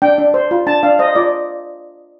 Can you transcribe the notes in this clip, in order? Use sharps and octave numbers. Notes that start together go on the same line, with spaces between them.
D4 G5
D4
C5
F4
D4 A5
D4 F5
C5 D#5
F4 D5